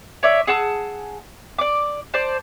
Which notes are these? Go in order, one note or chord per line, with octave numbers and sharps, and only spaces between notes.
C#5 D5 E5
G#4 F#5 A5 E6
D5 D6
C5 D5 A5